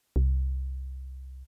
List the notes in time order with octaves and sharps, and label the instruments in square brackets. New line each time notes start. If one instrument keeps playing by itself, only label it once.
[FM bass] C2